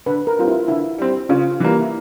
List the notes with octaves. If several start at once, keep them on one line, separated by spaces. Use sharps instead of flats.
D3 B4
A#4
G3 C4 F4
E4
D3 E4
G3 C4
C#3 F4
E3 G3 A#3
E4